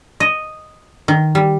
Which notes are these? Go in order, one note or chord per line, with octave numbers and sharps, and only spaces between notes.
D#5
D#3
G3